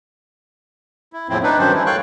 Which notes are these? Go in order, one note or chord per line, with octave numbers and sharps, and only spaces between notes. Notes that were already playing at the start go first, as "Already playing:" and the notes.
E4
E2 A2 F3 C4 E4
D4 D#4 B4
G2 D#3 F#3 C#4 D4 C5
E3 E4
A4 C#5 F5 G5 C#6 F#6